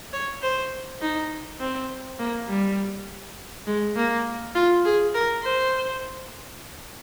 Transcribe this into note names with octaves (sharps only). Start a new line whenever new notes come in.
C#5
C5
D#4
C4
A#3
G3
G#3
A#3
F4
G#4
A#4
C5